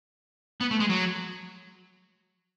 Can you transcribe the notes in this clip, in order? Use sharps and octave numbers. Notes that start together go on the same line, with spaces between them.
B3
A3
G#3
F#3